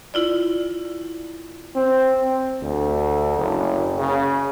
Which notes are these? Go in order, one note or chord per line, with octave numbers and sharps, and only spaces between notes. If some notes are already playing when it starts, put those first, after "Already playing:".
E4 F4 D5
C4
D2
F#1
C#3